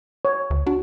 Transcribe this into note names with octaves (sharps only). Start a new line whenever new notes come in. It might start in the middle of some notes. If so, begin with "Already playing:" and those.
C#5
D2
D4 F#4